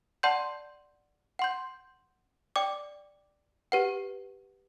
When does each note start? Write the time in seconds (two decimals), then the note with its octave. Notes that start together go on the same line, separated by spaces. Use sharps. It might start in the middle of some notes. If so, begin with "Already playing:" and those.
0.23 D5 F#5 A5 C6 G6
1.39 F#5 C6 G6
2.56 D5 G5 D6
3.72 G4 B4 F#5